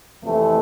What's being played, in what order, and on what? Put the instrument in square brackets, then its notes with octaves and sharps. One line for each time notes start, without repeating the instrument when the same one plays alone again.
[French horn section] F2 C3 E3 A3